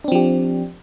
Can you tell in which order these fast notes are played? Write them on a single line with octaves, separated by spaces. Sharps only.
D4 C4 F3 G4